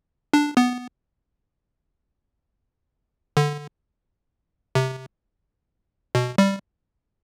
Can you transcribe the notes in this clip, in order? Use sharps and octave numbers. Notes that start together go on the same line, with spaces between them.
D4
B3
D3
C3
B2
G3